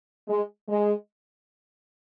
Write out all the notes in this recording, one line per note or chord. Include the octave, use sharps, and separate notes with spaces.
G#3
G#3